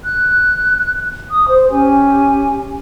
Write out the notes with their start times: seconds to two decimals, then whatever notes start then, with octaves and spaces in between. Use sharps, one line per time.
0.04 F#6
1.30 D#6
1.48 C5
1.69 C#4 G4 G#5